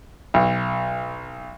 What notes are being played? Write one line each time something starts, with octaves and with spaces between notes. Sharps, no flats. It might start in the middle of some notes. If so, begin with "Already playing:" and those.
B1